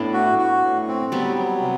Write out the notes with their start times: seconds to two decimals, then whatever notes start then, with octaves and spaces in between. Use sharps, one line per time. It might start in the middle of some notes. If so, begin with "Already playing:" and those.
Already playing: A2 B3 D4 E4
0.13 F#4
0.39 F#4
0.63 A2
0.88 C4
1.12 F#3 G3 B3
1.37 F#3
1.62 C3